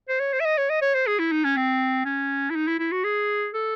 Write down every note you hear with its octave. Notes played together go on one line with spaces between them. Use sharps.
C5
C#5
C5
E5
D#5
C#5
D#5
C#5
C5
G#4
E4
D#4
C#4
C4
C#4
E4
D#4
E4
E4
F#4
G#4
A4